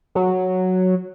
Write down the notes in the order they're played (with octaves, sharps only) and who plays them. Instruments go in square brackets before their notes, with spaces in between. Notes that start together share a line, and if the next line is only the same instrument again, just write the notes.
[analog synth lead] F#3